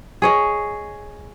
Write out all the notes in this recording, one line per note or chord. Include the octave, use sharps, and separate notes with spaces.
G#4 C#5 D#5